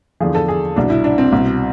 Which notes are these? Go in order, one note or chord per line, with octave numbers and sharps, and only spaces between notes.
E2 D3 F3 G#4
A4
G#4
C2 B2 D4
E4
D4
C4
C2 B2